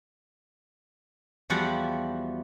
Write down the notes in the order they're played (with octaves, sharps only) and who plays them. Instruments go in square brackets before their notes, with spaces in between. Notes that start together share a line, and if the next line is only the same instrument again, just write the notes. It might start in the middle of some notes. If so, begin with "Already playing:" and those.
[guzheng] E2 F3 G3 F#4 F#5 B5